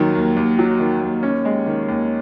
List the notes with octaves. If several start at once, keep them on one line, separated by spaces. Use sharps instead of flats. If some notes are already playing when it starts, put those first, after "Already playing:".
Already playing: D#2 D#3 F#3
D#2
D#2
F#3
D#3
D#2
C#4
G#3
D#3
D#2